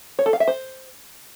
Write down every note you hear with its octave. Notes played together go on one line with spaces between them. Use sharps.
C#5
A4
F5
E5
C5